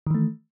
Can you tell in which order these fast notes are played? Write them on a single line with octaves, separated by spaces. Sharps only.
D#3 E3 A3